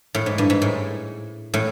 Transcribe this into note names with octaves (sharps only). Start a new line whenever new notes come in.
A2
G#2
G2
G#2
A2
A2